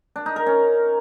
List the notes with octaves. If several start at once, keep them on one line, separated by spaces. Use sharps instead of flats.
D4
D#4
A#4
C#4